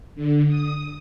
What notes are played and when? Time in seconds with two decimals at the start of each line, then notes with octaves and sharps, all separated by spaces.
0.15 D3
0.48 D#6